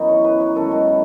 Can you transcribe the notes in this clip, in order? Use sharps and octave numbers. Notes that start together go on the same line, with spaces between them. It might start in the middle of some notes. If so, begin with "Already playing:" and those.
Already playing: F#2 E3 B3 D#4
C#5
B4
C#5
F#2 D#3 G#3 C#4 A4
F#4
E4